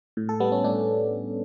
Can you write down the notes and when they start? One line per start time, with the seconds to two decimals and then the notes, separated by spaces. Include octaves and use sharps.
0.17 A2
0.29 A4
0.40 G3 B3
0.52 C#4
0.64 A2 D4